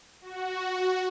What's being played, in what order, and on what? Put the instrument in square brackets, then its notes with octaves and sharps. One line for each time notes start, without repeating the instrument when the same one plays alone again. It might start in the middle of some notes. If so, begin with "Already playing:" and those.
[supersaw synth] F#4